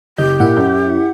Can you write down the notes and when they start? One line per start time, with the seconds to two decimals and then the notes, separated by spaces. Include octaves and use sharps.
0.18 F#1 G4 D#5 G6
0.40 A#2 E4 E5 F#5
0.57 F#2 G6